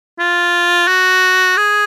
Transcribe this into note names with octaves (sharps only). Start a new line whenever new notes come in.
F4
F#4
G#4